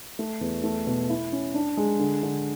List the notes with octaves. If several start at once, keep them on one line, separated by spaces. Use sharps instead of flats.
A3
E2
A3
B2
E4
C#4
D4
G#3
D3
D3